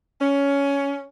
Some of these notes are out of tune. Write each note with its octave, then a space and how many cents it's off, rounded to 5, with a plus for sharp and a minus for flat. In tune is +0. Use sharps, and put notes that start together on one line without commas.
C#4 +15